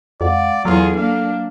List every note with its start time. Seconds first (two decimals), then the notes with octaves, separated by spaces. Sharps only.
0.21 F2 G#3 D5 F5 F#5
0.65 E2 F#3 F4 G#4 A4
0.96 A#3 D4 F5